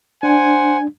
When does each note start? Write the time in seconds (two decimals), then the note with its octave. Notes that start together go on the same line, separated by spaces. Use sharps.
0.23 D4 C5 F#5 G#5